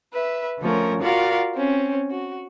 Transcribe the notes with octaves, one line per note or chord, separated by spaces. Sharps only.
B4 E5
D3 F3 A3 C#4 A#4
F4 F#4 A#4 D5 F5 F#5
C4 C#4
F#4